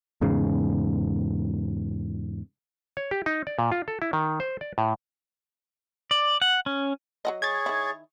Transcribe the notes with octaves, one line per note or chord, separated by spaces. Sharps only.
E2 G#2 C#3
C#5
G4
D#4
D5
A#2
F4
A4
E4
D#3
C5
D5
A2
D5
F#5
C#4
F#3 F#4 D#5
G#4 C#5 G#6 A6
D#3 E4